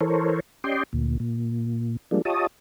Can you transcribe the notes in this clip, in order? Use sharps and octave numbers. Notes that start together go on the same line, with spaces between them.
E3 A4 A#4 C5 C#5
C#4 G4 D5 D#5 G5 C6
D2 A#2
A#2
F3 G3 G#3 A#3 D4
F4 G4 C#5 D#5 A5 D#6